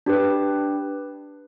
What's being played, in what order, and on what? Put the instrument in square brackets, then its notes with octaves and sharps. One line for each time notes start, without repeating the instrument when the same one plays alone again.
[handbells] D4 G4 B4